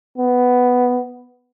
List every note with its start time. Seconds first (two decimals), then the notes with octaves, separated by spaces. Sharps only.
0.18 B3